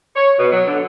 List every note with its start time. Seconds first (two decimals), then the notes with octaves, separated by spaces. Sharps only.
0.15 C#5
0.39 B2
0.52 F#3
0.67 D3